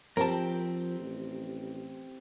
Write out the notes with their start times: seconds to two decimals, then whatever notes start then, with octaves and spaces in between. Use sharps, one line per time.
0.17 F3 C4 G4 A#4 A5
0.99 A1